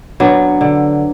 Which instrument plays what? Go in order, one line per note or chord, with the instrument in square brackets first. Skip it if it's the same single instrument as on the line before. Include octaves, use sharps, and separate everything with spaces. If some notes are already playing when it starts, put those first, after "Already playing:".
[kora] F#3 [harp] B3 D4
[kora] D3